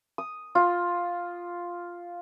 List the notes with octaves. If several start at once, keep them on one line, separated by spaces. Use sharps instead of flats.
D#6
F4